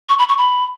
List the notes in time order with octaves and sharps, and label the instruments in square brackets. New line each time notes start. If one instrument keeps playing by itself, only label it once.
[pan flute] C#6
B5
C#6
B5